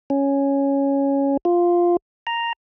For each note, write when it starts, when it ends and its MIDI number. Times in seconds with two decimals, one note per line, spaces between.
0.10 1.37 61
1.45 1.97 65
2.27 2.53 82